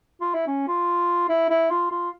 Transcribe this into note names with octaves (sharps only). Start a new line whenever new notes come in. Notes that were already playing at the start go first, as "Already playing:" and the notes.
F4
E4
C#4
F4
E4
E4
F4
F4